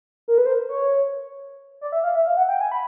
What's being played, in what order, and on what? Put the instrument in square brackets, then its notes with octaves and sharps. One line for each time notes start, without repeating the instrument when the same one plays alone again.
[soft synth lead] A#4
B4
C5
C#5
D5
E5
F5
E5
F5
F#5
G5
G#5
B5